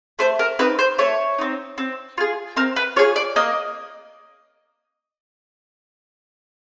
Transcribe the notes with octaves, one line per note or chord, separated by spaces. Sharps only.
A3 C5
A#4
C4 D#4 B4
C5
A3 C#5
C4 D#4
C4
F4 G#4
C4 A#4
B4
F4 G#4 C#5
D5
A#3 D#5